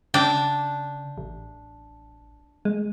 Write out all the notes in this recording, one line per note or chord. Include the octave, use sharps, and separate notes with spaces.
C#3 D4 G5
A1
G#3